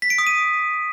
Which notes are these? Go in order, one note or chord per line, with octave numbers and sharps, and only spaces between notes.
B6
D7
D#6
D#7